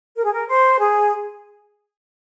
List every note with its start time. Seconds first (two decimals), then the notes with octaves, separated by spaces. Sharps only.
0.15 A#4
0.23 G#4
0.31 A#4
0.47 C5
0.78 G#4